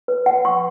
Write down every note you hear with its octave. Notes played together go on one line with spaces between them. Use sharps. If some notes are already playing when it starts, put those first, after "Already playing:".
B4
F#5
C#6